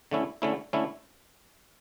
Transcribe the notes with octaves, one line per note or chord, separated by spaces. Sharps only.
D3 A3 C#4 E4
D3 A3 C#4 E4
D3 A3 C#4 E4